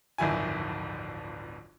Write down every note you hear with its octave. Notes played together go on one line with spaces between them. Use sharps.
D1 G1 F2 D#3 E4 G#5